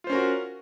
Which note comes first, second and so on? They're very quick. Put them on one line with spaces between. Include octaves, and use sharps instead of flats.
F4 C5 C#4 A#4 F#4